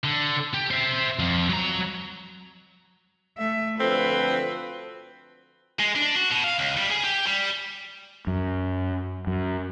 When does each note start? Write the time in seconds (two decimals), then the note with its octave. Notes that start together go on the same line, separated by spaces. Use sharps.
0.04 D3
0.54 G4
0.71 C5 E5
1.19 F2
1.49 F#3 A#5
3.38 A3 E5
3.80 D2 F3 C4 A4 B4
5.80 G#3
5.96 D4
6.16 F#4
6.31 B2
6.44 F5
6.59 C#2
6.77 G3
6.91 G#4
7.04 G4
7.27 G3
8.27 F#2
9.27 F#2